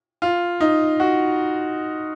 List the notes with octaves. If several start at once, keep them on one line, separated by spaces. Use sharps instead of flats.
F4
D#4
F#4